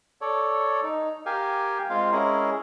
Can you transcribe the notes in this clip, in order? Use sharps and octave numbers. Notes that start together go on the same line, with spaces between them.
A4 C#5 D5
D#4
G4 A#4 F5 G5 G#5
G#3 C4 F4 F5
G#3 C#4 E4 G#4 A#4